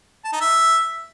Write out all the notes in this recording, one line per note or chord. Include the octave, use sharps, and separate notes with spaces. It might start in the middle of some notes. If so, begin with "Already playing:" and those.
A5
D#4
E5